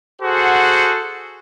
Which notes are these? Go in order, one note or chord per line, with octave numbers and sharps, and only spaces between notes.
F#4 G#4 A4 C5 F#5